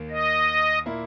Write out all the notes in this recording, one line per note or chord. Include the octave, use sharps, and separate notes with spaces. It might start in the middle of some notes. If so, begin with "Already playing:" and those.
Already playing: D#2 D#3 A#3
D#5
A#2 A#3 E4